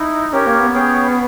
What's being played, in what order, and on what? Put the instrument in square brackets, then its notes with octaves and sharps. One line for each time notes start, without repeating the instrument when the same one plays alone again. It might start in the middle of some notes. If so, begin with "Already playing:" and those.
Already playing: [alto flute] D#4 [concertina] E4
[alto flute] C#4 [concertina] G4 A#4 C#5
[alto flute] A#3
B3
[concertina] C#4 G#4 C#5 G5